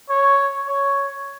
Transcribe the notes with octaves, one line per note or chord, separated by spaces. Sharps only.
C#5
C#5